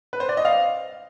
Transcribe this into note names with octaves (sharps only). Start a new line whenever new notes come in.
B4
C5
D5
D#5
F5